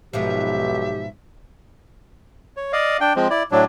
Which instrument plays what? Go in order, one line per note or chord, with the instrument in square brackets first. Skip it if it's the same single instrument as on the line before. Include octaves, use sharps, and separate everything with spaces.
[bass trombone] B1 [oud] G#2 B2 F3 [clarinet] G4 [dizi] E5
[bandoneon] C#5
D5 D#5 F5
D4 G5
F3 G#3 C4
E4 D5
A2 F#3 D4